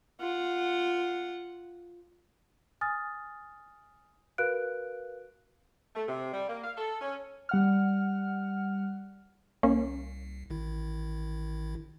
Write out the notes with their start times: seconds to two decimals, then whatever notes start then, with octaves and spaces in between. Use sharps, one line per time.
0.21 F4 F#5
2.81 G#5 D#6 F6 A6
4.38 F#4 A#4 B4 F5 F#6 D7
5.96 A3
6.09 C3
6.33 G3
6.49 A#3
6.64 F5
6.77 A4
7.01 C#4
7.49 G3 F#5 F6
9.63 C2 A#3 C#4
10.50 A1 D#3 E4